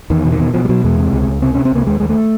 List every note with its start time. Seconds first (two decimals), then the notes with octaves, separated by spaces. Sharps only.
0.10 E2 D#3
0.24 B2
0.32 D#3
0.39 B2
0.54 B2 F3
0.65 G3
0.69 B2 F#3
0.84 E2 G#3
0.99 C3
1.13 C#2
1.28 C#2
1.42 C3 C4
1.54 C3 C#4
1.65 C4
1.72 C#2 A#3
1.87 D#2 G#3
2.00 D#2 G#3
2.09 A3